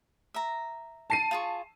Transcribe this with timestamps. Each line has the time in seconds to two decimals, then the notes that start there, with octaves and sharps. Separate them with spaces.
0.34 E5 A#5
1.10 A5 C7 D#7
1.31 F4 G#4 C#6